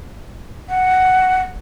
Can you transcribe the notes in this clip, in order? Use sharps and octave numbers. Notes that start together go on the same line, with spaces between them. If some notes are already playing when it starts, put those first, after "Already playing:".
F#5